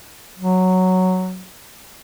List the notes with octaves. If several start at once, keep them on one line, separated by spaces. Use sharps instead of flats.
F#3